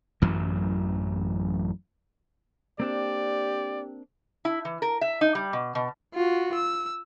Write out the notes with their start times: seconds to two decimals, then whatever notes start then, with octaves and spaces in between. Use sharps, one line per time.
0.22 A1 F#2 E3 F#3
2.80 A#3 C4 D4 G4 D5
4.45 E4
4.65 E3
4.82 A#4
5.01 E5
5.21 D#4
5.35 G3
5.53 B2
5.75 B2
6.14 F4 F#4
6.54 E6